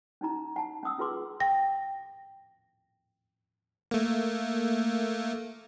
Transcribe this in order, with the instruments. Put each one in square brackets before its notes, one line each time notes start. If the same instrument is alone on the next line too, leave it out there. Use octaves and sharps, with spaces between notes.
[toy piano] C#4 D#4 E4 A#5
F#5 A5
C#4 F#5 D#6 E6
C#4 F4 G#4 B4 C6 D6
[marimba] G5 A#6
[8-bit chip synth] A3 A#3